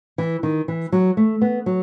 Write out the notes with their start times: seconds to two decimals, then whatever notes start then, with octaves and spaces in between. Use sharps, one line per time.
0.18 E3
0.43 D#3
0.68 E3
0.92 F#3
1.17 A3
1.42 B3
1.66 F#3